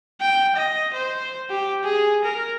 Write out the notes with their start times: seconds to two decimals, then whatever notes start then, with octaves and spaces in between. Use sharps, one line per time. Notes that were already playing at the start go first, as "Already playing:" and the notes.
0.21 G5
0.56 D#5
0.94 C5
1.50 G4
1.83 G#4
2.24 A#4